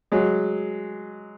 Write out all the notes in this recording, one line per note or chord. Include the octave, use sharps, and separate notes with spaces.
F#3 G#3